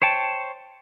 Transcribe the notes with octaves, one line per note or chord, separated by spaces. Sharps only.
C5 C#5 G5 A5